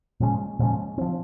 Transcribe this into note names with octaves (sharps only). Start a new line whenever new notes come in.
A#2 F3 G#3 C#4
A#2 F3 G#3 C#4
F3 C4